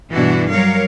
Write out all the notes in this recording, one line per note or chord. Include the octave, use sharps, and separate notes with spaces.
G2 B2 E3 D4 E4 F#4
F#3 G3 A#4 C#5 F5